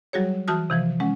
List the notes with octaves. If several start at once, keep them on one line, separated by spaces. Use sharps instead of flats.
F#3 G3 F#4 G#4 C#5
E3 F#4 A5 D#6 F6
C3 E3 F3
G#3 C#4 F#5